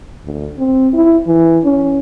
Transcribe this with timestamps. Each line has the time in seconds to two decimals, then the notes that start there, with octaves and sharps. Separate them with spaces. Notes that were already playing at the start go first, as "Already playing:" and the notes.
0.24 D2
0.58 C4
0.94 E4
1.27 E3
1.64 C#4